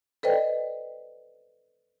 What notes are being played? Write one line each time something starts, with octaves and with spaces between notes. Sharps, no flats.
A4 B4 C5 D5 D#5 G5